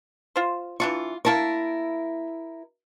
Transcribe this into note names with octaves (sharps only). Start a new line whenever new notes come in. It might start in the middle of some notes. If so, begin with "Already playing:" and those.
F4 C5
E3 D4 F4 C#6
A#3 E4 A#4 A5 C#6